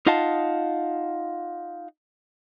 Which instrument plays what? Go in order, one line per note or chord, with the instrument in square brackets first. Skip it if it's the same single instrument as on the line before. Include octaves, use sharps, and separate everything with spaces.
[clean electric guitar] D#4 F4 D#5 F5 F#5 A5